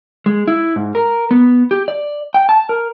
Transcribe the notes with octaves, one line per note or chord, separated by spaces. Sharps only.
G#3
E4
G#2
A#4
B3
G4
D5
G5
A5
A#4